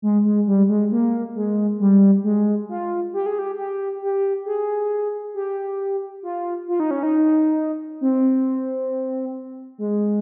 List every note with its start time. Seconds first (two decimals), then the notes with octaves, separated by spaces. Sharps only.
0.02 G#3
0.25 G#3
0.47 G3
0.69 G#3
0.92 A#3
1.35 G#3
1.80 G3
2.24 G#3
2.69 F4
3.13 G4
3.26 G#4
3.39 G4
3.58 G4
4.02 G4
4.46 G#4
5.34 G4
6.23 F4
6.68 F4
6.80 D#4
6.91 C#4
7.03 D#4
8.01 C4
9.78 G#3